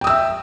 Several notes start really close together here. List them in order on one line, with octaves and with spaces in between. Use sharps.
G5 D#6 E6 E5